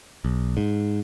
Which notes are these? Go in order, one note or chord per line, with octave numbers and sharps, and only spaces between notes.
B1
G#2